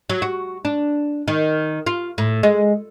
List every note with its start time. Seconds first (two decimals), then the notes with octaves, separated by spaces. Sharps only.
0.10 F#3
0.22 F#4
0.65 D4
1.28 D#3
1.86 F4
2.18 A2
2.43 G#3